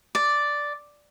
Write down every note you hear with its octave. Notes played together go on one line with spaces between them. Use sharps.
D5